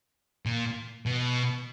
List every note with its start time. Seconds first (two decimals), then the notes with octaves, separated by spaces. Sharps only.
0.46 A#2
1.06 B2